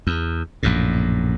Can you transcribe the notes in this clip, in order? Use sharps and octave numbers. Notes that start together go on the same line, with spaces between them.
E2
A#1 F#2 A2